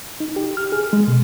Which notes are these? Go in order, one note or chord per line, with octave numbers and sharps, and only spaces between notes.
D#4
G4
F6
G#4
G#3
B2